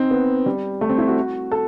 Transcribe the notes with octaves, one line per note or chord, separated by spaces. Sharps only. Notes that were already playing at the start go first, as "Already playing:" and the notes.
Already playing: C4 D#4
B3
G3
A3
C4
E4
F#4
A4